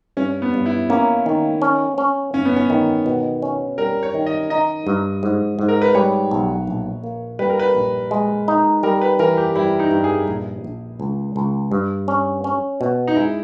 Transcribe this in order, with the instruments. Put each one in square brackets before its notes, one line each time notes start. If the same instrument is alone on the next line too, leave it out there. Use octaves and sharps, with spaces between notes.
[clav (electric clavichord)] G2 [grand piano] C#4
[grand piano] B3
[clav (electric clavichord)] G2
[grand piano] E4
[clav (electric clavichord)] A#3 [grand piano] C#4
[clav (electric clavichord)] D#3
C#4
C#4
[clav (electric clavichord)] G1 [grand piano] C#4
[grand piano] B3
C#4
[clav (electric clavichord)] D#3
B2
C#4
[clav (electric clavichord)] G3 [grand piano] A#4
[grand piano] C#5
[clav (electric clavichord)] D#3
[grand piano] D#5
[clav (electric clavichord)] D#4 [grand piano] D#5
[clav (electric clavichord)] G2
G#2
G#2
[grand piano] A#4
B4
[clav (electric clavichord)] G3 [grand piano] C#5
[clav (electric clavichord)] B1
A#1
A#3
[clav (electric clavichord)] G3 [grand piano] B4
[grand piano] A#4
B4
[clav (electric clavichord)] A#1
G#3
D#4
[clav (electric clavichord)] G3 [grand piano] A#4
[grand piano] B4
[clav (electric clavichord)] E3 [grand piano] A#4
[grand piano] G4
[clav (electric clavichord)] G3 [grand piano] E4
[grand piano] D#4
[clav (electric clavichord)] G2
[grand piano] G#4
[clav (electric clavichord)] A#1
A#1
C#2
C#2
G2
C#4
C#4
B2
[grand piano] D#4
[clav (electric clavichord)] G#3 [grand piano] E4